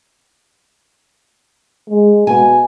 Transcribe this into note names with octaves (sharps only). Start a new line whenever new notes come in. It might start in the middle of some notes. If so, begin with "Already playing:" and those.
G#3
B2 G#5